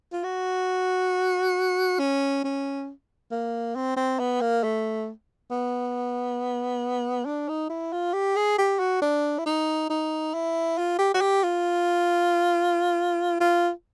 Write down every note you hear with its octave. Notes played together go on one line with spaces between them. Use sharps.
F4
F#4
C#4
C#4
A#3
C4
C4
B3
A#3
A3
B3
D4
D#4
E4
F4
G4
G#4
G4
F#4
D4
E4
D#4
D#4
E4
F4
G4
F#4
G4
F4
F4